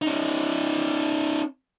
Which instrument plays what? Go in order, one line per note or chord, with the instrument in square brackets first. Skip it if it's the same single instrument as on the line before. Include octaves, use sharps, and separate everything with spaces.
[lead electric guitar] C#4 D#4